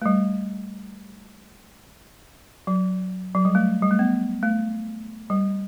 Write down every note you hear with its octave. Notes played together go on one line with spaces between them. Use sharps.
A3
G3
F#3
F#3
G3
A3
G3
A3
B3
A3
G3